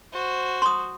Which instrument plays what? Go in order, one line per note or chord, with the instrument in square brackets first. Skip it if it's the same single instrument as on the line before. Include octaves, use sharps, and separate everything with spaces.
[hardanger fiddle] F#4 C5
[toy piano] C6 D#6